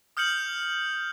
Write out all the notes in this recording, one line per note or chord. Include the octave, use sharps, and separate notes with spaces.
D#6 F6 G6 C#7 F#7